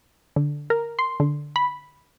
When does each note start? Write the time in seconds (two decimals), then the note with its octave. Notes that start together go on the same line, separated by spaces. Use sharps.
0.36 D3
0.70 A#4
0.99 C6
1.20 D3
1.56 B5